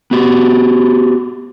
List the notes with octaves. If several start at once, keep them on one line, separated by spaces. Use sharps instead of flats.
B3 F#4 G4